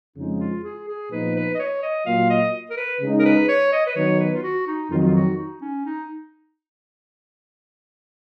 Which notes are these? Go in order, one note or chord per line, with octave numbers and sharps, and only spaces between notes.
F2 C#3 F3 G#3 D#4
F4
G#4
G#4
A#2 F3 B3 D#4 B4
B4
D#5
C#5
D#5
A#2 F#3 A#3 F4 F5
D#5
A#4
B4
C#3 G#3 D#4
A#4
B4
C#5
D#5
B4
D#3 F#3 B3 D#4 C#5
B4
F4
F#4
D#4
F2 D#3 F#3 F4
D#4
F4
F#4
D#4
C#4
D#4